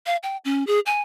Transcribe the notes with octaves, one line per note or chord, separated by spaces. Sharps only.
F5
G5
C#4
G#4
G#5